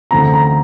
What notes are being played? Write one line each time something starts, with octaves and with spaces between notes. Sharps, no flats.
D2 C#3 E3 A3 C4 A#5
A#5